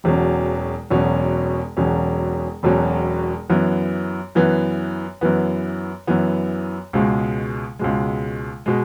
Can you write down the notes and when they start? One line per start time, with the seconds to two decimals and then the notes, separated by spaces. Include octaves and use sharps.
0.04 E1 E2 B2 F#3 C#4
0.91 E1 E2 B2 F#3 C#4
1.77 E1 E2 B2 F#3 C#4
2.63 E1 E2 B2 F#3 C#4
3.50 F#2 E3 B3
4.35 F#2 E3 B3
5.21 F#2 E3 B3
6.07 F#2 E3 B3
6.93 C#2 B2 G#3
7.79 C#2 B2 G#3
8.66 B2 G#3